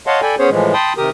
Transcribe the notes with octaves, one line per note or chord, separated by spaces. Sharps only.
C#5 D#5 F5 F#5 A5 C6
A4 D5 G5 G#5 B5
B3 C#4 G#4 C5 C#5
A2 E3 F3 G#3
G5 A5 B5 C6 D#6
C3 D#3 G4 A#4 D#6